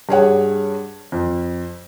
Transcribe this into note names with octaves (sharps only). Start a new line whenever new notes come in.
G2 G#4 C#5 F#5
F2